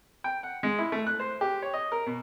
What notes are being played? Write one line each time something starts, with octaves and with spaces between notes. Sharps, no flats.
G5
F#5
G#3
E4
A3
F#6
C5
G4
C#5
D#5
A#4
B2